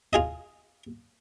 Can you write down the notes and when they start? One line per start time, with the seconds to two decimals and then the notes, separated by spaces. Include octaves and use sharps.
0.13 F4 G#4 D#5